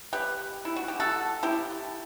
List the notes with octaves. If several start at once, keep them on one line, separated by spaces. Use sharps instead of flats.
G4 B4
E4
F#4
G4
F#4 A4
E4 G4